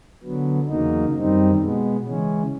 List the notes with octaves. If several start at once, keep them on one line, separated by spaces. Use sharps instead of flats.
D3 F#3 B3
E2 C#3 F#3 A#3 D#4
F#2 D#3 G3 C4 D#4
B2 G#3 B3
C#3 E3 G#3 C#4